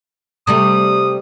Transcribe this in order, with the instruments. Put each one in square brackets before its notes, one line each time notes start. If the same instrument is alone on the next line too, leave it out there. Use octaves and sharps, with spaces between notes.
[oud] C3 G3 A3 [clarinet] D#6